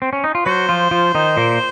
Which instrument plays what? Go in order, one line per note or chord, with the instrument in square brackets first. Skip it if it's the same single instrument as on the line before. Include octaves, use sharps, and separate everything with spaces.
[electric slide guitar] C4
C#4
D#4
F4
[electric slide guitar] F#3 F#4 [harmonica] C5
[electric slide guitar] F3 F4
F3 F4
D#3 D#4
A#2 A#3